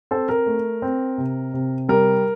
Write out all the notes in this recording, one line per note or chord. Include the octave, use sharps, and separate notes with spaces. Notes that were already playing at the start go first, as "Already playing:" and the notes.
C4 A4 C5
A#4
A3
C4
C3
C3
G3 A#4